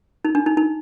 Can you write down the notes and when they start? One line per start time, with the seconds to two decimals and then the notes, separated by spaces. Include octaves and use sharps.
0.25 D#4
0.35 D4
0.46 D#4
0.57 D#4